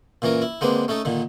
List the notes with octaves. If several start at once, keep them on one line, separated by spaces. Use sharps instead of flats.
A#2 E3 C#4 A#4
E4
D3 G#3 A#3 C4 D4 B4
A3 C#4 D#4 A4
A#2 D3 D#3